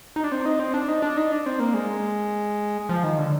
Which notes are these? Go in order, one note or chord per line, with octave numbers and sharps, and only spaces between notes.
D#4
D4
C4
D#4
C4
D4
D#4
D4
D#4
D4
C4
A#3
G#3
F3
D#3
D3